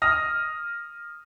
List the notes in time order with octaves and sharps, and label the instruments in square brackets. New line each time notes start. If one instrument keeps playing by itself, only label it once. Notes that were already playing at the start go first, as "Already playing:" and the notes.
[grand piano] D#6 F6 A#6